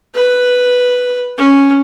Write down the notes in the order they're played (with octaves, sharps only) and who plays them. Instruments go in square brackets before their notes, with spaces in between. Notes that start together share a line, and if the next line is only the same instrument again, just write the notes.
[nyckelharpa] B4
C#4